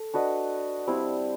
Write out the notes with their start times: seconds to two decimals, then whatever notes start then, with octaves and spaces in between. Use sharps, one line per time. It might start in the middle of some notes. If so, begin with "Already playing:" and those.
Already playing: A4
0.14 D4 F#4 B4 D#5
0.87 G3 C4 E4